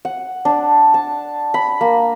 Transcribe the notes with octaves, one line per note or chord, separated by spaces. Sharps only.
F#5
D4
A5
B5
A#3